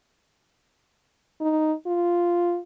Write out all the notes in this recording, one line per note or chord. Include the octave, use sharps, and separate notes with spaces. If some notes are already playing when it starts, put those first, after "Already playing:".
D#4
F4